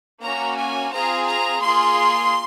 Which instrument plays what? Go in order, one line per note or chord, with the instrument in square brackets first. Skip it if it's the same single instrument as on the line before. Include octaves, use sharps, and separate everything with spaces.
[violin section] A#3 C#4 F#4 A#5
G#5
C4 F4 G#4 A#5
A#5
A#3 F4 G#4 C6